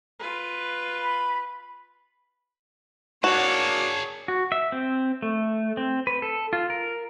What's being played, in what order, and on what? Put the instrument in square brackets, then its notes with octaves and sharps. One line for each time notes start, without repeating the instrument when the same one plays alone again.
[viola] F4 B4
[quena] B5
[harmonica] A#3 D4 [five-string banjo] F#4 [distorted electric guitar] G#4 A5 [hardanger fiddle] C#5
[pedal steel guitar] F#4
E5
C4
A3
C4
B4
A4
F4
A#4